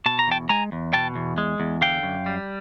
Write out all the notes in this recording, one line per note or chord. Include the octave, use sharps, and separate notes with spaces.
B2 A5
A#5
E2 G5 A5
G#3 G#5 A#5
E2
B2 G5 A5
E2
G#3
E2
D3 F5 G5
F#2
G3